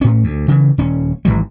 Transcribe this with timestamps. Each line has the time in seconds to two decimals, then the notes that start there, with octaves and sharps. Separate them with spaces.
0.01 A2 C#4
0.24 D2
0.48 C#3 E3
0.78 D#1 C#4
1.25 G#1 D2 E3 G3